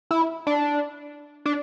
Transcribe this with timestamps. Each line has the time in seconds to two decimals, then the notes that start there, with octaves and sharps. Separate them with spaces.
0.11 E4
0.47 D4
1.45 D4